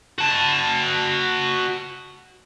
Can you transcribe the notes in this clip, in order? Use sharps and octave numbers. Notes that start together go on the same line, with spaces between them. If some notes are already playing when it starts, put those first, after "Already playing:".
F#4 A5